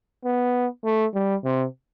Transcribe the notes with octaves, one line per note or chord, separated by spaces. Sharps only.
B3
A3
G3
C3